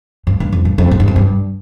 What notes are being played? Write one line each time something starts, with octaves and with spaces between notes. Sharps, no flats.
G2
G2
F2
G2
F2
G#2
G2
F2
G2